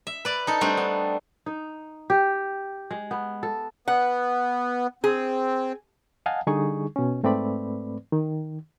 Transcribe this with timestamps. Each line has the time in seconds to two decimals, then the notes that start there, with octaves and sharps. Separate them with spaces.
0.07 E5
0.25 B4 D5
0.47 D#4 A4
0.61 G3 A3 C4 D4
0.77 B3
1.46 D#4
2.10 G4
2.91 G#3
3.11 B3
3.43 A4
3.88 B3 F#5
5.04 C4 G#4
6.26 D#5 F5 F#5 G#5 A5
6.47 D3 G3 D#4 G#4 C#6
6.96 B2 C#4
7.23 G#2 A3 C4 B4 D5 B5
8.12 D#3